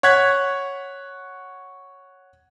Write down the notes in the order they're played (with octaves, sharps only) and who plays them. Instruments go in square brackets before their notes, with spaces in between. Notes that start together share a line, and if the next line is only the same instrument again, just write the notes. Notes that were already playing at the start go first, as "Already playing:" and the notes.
[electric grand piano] C#5 F#5 F#6 G#6 B6